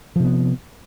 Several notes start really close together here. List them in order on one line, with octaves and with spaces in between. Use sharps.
F3 C3 B3